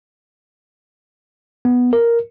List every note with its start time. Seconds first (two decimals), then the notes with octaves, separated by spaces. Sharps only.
1.65 B3
1.93 A#4